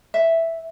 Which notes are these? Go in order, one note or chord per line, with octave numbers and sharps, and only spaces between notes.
E5